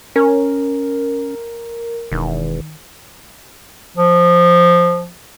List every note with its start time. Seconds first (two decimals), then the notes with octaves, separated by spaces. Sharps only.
0.16 C#4 A#4
2.12 E1 D#3
3.97 F3